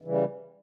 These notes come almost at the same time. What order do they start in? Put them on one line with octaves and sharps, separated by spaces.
E3 C#3 G3